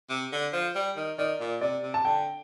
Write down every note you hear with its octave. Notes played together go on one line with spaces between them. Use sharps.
C3
D3
F3
G3
D#3
D#3 D5
A#2
C3 D5
C3
A5
D3 G5